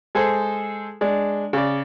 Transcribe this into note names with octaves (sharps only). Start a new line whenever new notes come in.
G#3 G#4 A4 C5
G#3 D4
C#3 D5